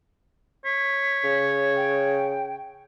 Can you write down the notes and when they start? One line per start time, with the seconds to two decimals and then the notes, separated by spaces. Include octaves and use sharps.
0.65 C#5 B6
1.24 C#3
1.76 G5